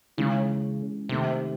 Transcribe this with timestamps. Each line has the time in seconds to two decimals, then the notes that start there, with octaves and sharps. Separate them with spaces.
0.17 C#3 E3 G#3 C#4
1.09 C3 D#3 A3 C4